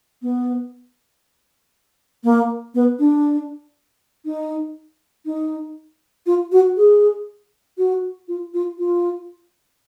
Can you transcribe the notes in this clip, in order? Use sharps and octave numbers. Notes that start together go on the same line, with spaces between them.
B3
A#3
B3
D4
D#4
D#4
F4
F#4
G#4
F#4
F4
F4
F4